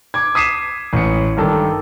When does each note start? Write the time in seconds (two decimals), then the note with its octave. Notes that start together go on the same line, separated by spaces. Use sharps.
0.14 D6 G#6
0.35 D#6 B6 C7 D#7 E7
0.93 A1 C#7
1.37 G2 D#3 A4 D6